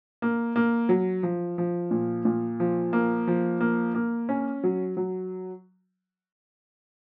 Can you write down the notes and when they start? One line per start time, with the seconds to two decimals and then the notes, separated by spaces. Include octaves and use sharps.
0.22 A#3
0.56 A#3
0.89 F#3
1.23 F3
1.58 F3
1.91 A#2
2.25 A#2
2.60 F3
2.93 A#3
3.27 F3
3.61 A#3
3.94 A#3
4.29 C#4
4.64 F#3
4.97 F#3